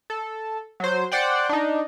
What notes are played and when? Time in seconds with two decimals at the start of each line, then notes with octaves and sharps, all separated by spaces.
0.10 A4
0.80 F#3 C5
1.12 C5 D5 F#5 G5
1.49 D4 D#4